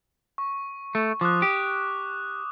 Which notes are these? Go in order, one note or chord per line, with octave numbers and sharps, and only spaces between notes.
C#6
A3
F3 D6 D#6 F#6
G4